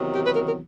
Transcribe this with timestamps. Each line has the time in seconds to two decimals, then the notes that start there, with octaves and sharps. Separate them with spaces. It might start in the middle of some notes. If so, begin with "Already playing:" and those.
Already playing: E2 C3 D#3 F#3
0.13 G4
0.25 B4
0.35 A#4
0.46 A#4